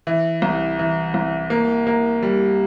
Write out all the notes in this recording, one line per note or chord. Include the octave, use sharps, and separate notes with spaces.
E3
C2
E3
C2
A#3
A#3
G3